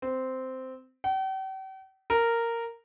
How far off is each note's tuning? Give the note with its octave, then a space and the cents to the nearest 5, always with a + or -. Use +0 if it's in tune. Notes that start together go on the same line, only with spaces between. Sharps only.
C4 -10
G5 -45
A#4 -10